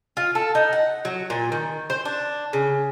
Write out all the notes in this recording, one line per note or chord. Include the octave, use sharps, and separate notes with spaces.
F4
A4
D#4
F#5
F#3
A#2
D#3
C5
D4
C#3